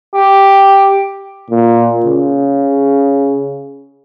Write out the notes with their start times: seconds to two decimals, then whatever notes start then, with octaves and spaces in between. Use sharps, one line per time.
0.14 G4
1.50 A#2
2.05 C#3